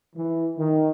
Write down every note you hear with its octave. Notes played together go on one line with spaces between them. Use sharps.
E3
D#3